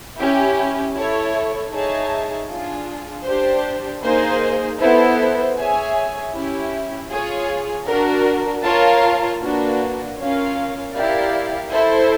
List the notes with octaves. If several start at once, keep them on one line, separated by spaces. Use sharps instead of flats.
C#4 E4 G4
E4 A4 C#5
D#4 G#4 C#5 E5 A5
D4 F4 G#4
D4 G4 C5
A#3 D#4 G#4 C5
B3 E4 A4 C5
G#4 C#5 E5 G#5
C#4 E4 G4
F4 G#4 C#5
D4 F#4 A#4
F4 A#4 C#5 F5 A5
A#3 D4 F#4 B4
C#4 F4 A#4 C#5 F5
E4 G4 A#4 D5 F5
E4 A4 C5